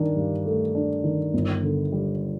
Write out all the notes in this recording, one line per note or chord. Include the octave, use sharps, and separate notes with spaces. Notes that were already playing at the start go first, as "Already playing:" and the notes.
Already playing: G2 D#3 D4
G2
A3
D4
D#3
G1
D3
G3